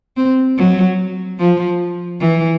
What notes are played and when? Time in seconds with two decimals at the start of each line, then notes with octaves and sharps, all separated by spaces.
0.17 C4
0.57 F#3
1.39 F3
2.21 E3